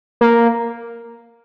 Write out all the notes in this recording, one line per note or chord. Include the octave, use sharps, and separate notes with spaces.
A#3